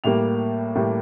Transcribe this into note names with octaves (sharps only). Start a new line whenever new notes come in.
A2 G3 A#3 F7
A2 G3 A#3